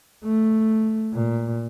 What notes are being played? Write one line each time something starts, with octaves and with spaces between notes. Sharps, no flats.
A3
A#2